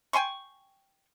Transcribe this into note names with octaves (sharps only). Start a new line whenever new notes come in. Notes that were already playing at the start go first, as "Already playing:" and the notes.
G5 G#5 C6 C#6